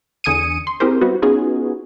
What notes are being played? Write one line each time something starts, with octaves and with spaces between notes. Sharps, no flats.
E2 D3 G#5 D#6 C#7 D#7
C6
C4 E4 G4 G#4 A#4 C5
G3 B3 E4 F#4 C5
B3 C#4 D#4 F4 F#4 G#4